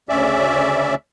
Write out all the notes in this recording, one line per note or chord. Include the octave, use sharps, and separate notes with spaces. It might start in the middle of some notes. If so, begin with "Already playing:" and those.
D2 C#3 C#4 D5 E5